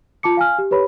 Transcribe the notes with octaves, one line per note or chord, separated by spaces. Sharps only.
F4 A5 D6 C#7
F5 G#5 F6
G4
G4 B4 C#5 B5